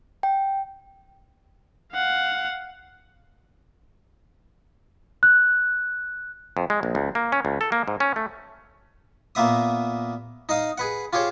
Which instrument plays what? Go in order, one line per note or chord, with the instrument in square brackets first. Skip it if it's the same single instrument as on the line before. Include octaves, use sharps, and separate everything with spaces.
[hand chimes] G5
[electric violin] F5 F#5
[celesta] F#6
[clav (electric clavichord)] F2
G#3
A#1
C#2
A#3
C#4
C#2
A4
A#3
G#2
C#4
A3
[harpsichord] A#2 A#3 B3 E5 D#6
D#4 D#5 F5 D#6
G#4 B4 F#5
F4 G4 G#4 C5 C#5